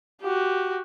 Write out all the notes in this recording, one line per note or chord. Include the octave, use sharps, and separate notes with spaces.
F#4 G4